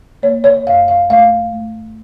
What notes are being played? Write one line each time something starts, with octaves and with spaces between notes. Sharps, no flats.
A#3 C#5
C#5
F#2 F5
F5
A3 F5
A3